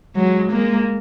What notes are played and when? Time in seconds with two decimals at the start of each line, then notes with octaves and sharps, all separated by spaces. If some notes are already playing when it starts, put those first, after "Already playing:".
0.16 F#3 G#3
0.51 G#3 A#3